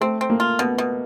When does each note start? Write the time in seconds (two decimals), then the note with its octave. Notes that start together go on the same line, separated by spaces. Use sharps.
0.01 A3 C4
0.21 C4
0.30 A#3
0.40 F4
0.59 B2 B3
0.78 B2